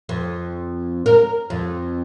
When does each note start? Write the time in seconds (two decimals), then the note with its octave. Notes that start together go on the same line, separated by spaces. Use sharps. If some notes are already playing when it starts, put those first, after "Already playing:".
0.09 F2
1.06 A#4
1.50 F2